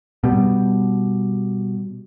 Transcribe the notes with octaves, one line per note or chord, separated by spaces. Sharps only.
B2 G3